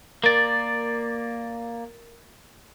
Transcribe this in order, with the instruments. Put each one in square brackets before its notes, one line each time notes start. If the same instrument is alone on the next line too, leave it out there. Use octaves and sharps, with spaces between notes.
[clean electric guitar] A#3 D5 [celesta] A#4 A6